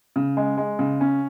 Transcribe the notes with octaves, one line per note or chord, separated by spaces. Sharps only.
C#3
G#3
G#3
C#3
C#4